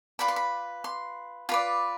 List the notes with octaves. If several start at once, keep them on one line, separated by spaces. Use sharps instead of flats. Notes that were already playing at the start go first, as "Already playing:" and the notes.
F4 B4 D5 B5
C6
B5
C6
F4 B4 D5 B5